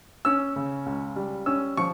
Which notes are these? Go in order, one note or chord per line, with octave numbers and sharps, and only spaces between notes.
C#4 E6
C#3
C#2
G3
C#4 E6
F3 C#6